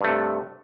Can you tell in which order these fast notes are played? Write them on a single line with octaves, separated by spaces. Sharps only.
G2 A3 C3